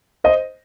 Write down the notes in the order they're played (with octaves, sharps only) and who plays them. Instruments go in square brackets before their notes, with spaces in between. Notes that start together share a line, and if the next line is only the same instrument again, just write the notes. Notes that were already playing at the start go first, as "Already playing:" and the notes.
[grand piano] C5 D#5